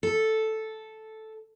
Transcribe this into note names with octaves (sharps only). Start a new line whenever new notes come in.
A4